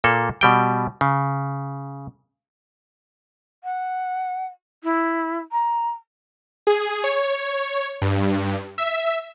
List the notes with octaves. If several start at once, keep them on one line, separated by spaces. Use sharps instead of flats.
A#2 A#3 A4
B2 G3 G5
C#3
F#5
E4
A#5
G#4
C#5
G2
E5